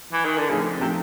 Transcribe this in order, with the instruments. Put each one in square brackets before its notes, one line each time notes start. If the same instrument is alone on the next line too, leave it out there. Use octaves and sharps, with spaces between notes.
[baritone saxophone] E3
D#3
D3
[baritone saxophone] C#3 [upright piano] F3 A3 C4 D#4
[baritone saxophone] C3 [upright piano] F3 A3 C4 D#4